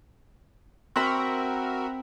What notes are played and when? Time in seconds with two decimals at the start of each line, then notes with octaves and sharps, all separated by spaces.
0.96 C4 F#4 A#4 E5 B5